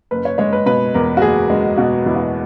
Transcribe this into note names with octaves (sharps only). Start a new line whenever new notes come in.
F#1 B4
C#5
G#3 C#5
B4
B2 B4
E2 A#4
F#4
F#1 G#4
G#3
B2 F#4
E2 E4
F#4